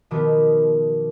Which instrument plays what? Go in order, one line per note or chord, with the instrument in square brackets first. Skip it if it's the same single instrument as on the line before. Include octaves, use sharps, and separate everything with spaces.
[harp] B2 D#3 F3 B3 G4